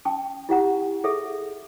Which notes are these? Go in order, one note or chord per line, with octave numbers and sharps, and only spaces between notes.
C#4 G5 A5 C#6
E4 G4 F#5 A#5
G#4 A4 E5